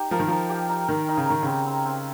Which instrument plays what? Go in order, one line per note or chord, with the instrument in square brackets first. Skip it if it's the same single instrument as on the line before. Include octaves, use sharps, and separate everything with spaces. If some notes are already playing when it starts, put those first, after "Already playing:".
Already playing: [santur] D#4 G4
[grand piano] F3 [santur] A#4
[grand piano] D#3
[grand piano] F3 [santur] D#4
[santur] G4
D#4
[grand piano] D#3 [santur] A#4
[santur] D#4
[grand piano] C#3
[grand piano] D#3 [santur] D#4
[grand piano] C#3 [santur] C4
[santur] C4
C4